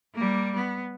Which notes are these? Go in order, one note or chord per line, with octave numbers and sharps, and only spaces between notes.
G3 A#3
B3